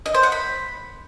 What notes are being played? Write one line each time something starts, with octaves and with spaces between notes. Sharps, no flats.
D#5
C5
F#5
B5